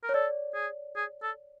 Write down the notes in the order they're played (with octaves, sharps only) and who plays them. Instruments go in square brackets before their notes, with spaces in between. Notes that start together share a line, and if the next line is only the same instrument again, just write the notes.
[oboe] A#4
[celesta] C#5
[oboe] A4 [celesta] D5
[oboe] G#4
G#4
A4